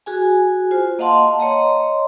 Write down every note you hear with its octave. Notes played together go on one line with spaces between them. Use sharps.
F#4 G#4 G#5
F4 C5
A#3 D#5 F5 F#5 A5 C6
C#5 D#5 A#5 C6